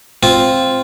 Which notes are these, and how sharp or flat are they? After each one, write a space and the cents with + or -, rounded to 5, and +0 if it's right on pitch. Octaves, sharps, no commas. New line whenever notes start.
C4 +0 F4 +0